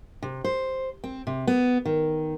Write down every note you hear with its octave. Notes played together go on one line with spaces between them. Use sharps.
C3
C5
C4
C3
B3
D#3